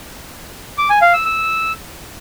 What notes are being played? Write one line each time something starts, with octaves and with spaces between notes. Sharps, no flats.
D6
G#5
F5
E6
E6